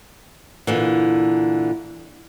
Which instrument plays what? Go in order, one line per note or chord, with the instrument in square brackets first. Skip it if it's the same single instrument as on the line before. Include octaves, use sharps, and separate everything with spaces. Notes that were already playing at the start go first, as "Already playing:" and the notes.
[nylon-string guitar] A#2 D3 E3